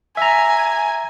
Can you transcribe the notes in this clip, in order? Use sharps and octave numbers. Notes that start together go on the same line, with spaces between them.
E5 G#5 A#5